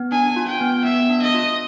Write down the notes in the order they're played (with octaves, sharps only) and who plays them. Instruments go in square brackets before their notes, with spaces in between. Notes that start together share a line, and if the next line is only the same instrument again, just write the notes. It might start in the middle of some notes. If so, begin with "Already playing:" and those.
Already playing: [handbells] B3
[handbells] D4 [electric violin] G#5
[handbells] F4
[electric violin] G5
[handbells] B3
[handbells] B3 [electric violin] E5
[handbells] D4
[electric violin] D#5
[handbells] F4